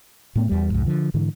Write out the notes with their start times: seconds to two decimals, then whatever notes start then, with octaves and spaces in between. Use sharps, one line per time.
0.35 A2 A3 B3
0.49 E2 G3
0.70 C2 F2 G#2
0.86 D3 F3
1.14 G#2 D3 E3